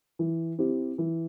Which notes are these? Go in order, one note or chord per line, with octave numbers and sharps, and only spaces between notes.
E3
C4 E4 G4
E3